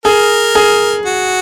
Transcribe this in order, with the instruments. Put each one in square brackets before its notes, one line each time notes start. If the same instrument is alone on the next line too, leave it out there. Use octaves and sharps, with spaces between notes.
[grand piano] G#4 [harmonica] A#4
[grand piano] G#4
[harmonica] F#4